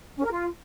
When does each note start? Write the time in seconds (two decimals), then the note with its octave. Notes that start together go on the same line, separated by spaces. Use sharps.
0.17 C#4
0.24 A#4
0.31 F4